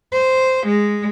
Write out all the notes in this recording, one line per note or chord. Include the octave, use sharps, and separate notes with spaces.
C5
G#3